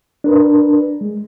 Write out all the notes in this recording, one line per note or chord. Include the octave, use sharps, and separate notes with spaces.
D4 A#4 B4
G#3